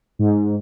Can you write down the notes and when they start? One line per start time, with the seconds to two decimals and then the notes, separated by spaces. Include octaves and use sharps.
0.19 G#2